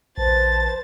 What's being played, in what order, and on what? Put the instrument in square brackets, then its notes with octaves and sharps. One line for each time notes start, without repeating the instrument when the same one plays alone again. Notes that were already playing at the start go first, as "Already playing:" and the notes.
[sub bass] A#1 [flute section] B4 C5 A5 [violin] A6